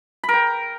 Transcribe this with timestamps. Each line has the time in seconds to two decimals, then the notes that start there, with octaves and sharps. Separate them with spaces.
0.24 B5
0.29 A#4
0.34 G5